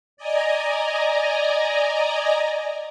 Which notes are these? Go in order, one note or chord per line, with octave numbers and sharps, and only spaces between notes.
D5 D#5 G#5 A#5